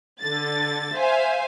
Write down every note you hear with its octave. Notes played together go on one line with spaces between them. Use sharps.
D3 A6
C5 E5 F5 G#5